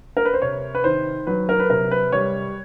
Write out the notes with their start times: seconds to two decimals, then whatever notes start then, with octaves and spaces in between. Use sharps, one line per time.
0.17 A#4
0.25 B4
0.34 C5
0.42 C3 C#5
0.75 B4
0.84 D#3 C5
1.27 F#3 B4
1.49 A#4
1.59 B4
1.70 C3 A#4
1.91 B4
2.12 G3 C#5